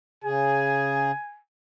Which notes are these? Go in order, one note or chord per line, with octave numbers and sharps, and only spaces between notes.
C#3 G#4 G#5